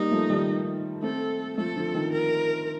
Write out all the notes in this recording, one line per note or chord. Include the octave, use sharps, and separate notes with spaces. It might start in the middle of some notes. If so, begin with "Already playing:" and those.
Already playing: G3 A#3 D#4
F3 A3
D#3 G3
A3 C4 A4
F3 A3 A4
D3 F3
F3
D#3
A#4